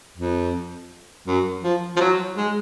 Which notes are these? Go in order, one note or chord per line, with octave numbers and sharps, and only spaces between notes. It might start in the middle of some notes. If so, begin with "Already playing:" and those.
F2
F#2
F3
F3
F#3
G#3